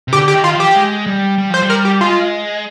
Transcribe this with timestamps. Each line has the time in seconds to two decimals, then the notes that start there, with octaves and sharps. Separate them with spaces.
0.08 C3
0.12 D3 G4
0.28 G4
0.33 D#3
0.44 F4
0.55 F3
0.60 G4
0.75 G#3
1.06 G3
1.38 G3
1.50 F3 C5
1.62 G3
1.70 A#4
1.85 G4
2.01 G#3 F4